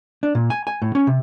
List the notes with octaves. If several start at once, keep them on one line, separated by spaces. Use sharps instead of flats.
D4
A#2
G#5
G#5
A2
C#4
C3